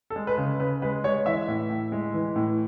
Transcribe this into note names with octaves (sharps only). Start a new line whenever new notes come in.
A4
G#3
B4
C#3
C#3 B4
G#3 B4
G#3 C#5
E3 E5
A2
A2
G#3
E3
A2